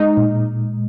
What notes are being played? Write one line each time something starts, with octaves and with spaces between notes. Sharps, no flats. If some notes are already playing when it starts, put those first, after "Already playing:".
Already playing: G#3 D#4
A#2